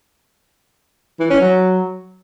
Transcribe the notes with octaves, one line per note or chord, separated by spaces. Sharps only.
E3
C#4
F#3